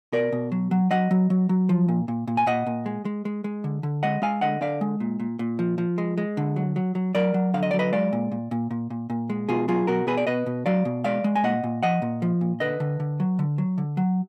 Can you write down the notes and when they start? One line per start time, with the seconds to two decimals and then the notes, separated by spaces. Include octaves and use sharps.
0.12 B2 A#4 D5
0.32 B2
0.52 F#3
0.71 F#3
0.91 F#3 D#5 F#5
1.11 F#3
1.30 F#3
1.49 F#3
1.69 F3
1.88 A#2
2.08 A#2
2.27 A#2
2.37 G#5
2.46 A#2 D#5 F#5
2.66 A#2
2.86 G#3
3.05 G#3
3.25 G#3
3.44 G#3
3.64 D3
3.83 D3
4.03 G#3 D#5 F#5
4.22 G#3 F5 G#5
4.41 D3 D#5 F#5
4.61 D3 D5 F5
4.81 G#3
5.00 A#2
5.20 A#2
5.39 A#2
5.59 F3
5.78 F3
5.98 G#3
6.18 G#3
6.37 D3
6.56 F#3
6.76 F#3
6.95 F#3
7.15 F#3 A#4 D5
7.34 F#3
7.54 D3 F5
7.63 D#5
7.71 F#3 D5
7.79 B4 D#5
7.93 G#3 D5 F5
8.13 A#2
8.32 A#2
8.51 A#2
8.71 A#2
8.90 A#2
9.10 A#2
9.30 G#3
9.49 B2 F4 G#4
9.68 F#3 F4 G#4
9.87 B2 F#4 A#4
10.07 B2 G#4 B4
10.17 D5
10.27 B2 B4 D#5
10.46 B2
10.66 F#3 D5 F5
10.85 B2
11.04 G#3 D5 F5
11.24 G#3
11.35 G#5
11.44 A#2 D#5 F#5
11.64 A#2
11.83 F3 D#5 F#5
12.02 A#2
12.22 F3
12.41 A#2
12.60 D3 B4 D#5
12.80 D3
13.00 D3
13.20 F#3
13.39 D3
13.58 F#3
13.78 D3
13.97 F#3